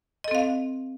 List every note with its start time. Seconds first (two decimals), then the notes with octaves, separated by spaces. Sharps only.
0.24 D#5
0.28 A4
0.31 C4
0.35 F5